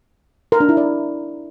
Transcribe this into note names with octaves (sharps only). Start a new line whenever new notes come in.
A#4
D4
E4
D5